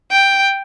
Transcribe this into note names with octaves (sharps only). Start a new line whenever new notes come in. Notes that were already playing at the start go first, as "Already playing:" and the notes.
G5